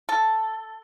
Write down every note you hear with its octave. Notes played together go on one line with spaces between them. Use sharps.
A4